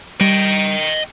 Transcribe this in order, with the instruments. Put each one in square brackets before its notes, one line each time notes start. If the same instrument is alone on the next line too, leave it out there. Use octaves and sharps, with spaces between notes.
[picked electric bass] G3 [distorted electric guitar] D#5 G5